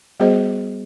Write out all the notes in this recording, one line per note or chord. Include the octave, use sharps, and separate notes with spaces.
G3 B3 F#4 G#4 C5 D#5